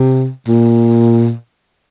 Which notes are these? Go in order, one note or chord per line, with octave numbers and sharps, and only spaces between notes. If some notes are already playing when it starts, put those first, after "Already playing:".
Already playing: C3
A#2